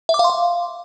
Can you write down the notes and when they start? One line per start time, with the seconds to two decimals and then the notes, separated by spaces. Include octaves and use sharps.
0.09 E5
0.14 D6
0.19 F5
0.24 C6
0.30 F5